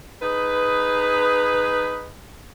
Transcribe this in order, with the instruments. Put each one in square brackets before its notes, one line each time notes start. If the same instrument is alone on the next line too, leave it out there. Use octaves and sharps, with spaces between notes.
[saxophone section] D#4 G#4 B4